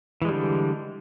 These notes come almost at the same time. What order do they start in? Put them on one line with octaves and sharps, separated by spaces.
E3 G#3 G3 D3